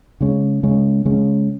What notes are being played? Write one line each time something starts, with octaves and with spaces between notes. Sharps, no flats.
C#3 G#3 C#4
C#3 G#3 C#4
C#3 G#3 C#4